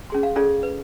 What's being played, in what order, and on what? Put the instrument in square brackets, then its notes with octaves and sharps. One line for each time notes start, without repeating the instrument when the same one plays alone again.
[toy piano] C#4 G#4 C6
F5
C#4 F4 G#4 A4 D5
B4